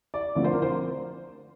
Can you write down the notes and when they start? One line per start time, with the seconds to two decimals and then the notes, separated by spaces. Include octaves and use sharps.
0.14 D5
0.35 D3 F3 A3 C4 D5
0.44 C5
0.53 A#4
0.62 C5